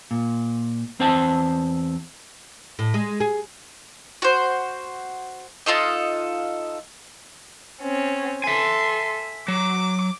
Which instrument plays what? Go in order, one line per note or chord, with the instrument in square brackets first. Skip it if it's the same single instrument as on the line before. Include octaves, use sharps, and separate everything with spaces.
[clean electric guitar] A#2
E2 C4 C5 G5 A5
[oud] A2
G#3
G#4
[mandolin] F#4 C5
D#4 F4 A4 D#5
[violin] C4 C#4
[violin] A4 C6 [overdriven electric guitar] E5 G#5
[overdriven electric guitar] F#3 [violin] D6